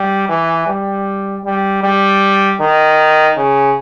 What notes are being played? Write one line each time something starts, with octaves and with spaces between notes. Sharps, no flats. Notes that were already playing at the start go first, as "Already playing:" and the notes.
Already playing: G3
E3
G3
G3
G3
D#3
C#3